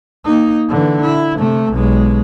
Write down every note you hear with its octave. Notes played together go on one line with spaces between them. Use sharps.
A#3 D#4
D3 E3
E4
C3 A3
B1 G#3